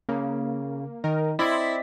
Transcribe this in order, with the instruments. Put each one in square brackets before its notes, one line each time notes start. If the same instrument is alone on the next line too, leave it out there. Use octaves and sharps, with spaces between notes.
[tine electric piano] C#3 [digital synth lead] A#3
[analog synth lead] D#3 [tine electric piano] D#4 [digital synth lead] A#4
[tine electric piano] C4 D5 D#5 [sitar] E4 [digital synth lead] C6 [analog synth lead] B6